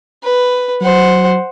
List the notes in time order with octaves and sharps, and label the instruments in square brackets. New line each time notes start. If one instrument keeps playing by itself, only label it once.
[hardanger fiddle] B4
[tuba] F#3 [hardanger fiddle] C5 F#5